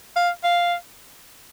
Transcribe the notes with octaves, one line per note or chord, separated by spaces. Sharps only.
F5
F5